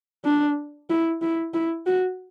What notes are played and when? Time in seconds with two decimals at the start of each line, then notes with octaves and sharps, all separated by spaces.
0.25 D4
0.90 E4
1.22 E4
1.54 E4
1.86 F#4